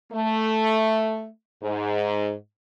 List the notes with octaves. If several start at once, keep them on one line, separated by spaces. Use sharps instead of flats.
A3
G#2